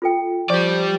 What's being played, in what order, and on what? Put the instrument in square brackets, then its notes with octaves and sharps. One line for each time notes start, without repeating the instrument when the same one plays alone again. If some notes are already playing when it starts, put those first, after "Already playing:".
[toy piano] F4 A4 G5
[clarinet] F3 [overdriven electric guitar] G4 D5 [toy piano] C#6 D6